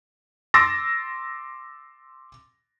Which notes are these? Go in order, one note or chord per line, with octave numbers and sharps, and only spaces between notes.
C6 D6 E6 A6 A#6